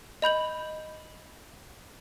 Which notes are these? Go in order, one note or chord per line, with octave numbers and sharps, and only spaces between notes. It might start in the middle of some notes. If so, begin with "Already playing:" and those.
D#5 B5 G6 F#7